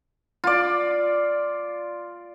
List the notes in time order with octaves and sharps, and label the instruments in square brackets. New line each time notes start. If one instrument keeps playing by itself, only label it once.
[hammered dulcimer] F4 D5